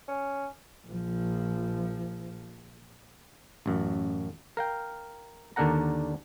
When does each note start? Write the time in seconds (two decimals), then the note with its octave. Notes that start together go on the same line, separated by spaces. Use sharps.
0.08 C#4
0.87 A#1 F3
3.66 A1 F#2
4.57 A#4 F5 G5
5.56 D#2 D3 D4 A#4 F#5 A#5